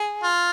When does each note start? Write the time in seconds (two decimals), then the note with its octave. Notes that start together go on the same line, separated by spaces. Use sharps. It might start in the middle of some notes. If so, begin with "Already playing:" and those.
Already playing: G#4
0.23 F4